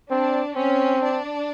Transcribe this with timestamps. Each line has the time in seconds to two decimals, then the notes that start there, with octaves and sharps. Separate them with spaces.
0.11 C4 D4
0.56 C4 C#4
1.02 D4